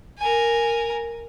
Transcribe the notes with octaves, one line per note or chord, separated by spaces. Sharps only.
A#4 G#5